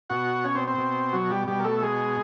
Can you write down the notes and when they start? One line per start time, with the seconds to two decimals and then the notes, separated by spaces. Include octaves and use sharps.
0.10 B2 F#4 F#5
0.44 C#4 C#5
0.55 C4 C5
0.67 C4 C5
0.78 B2
1.13 F#3 F#4
1.31 G3 G4
1.47 B2 G3 G4
1.60 A#4
1.64 A3 A4
1.83 G#3 G#4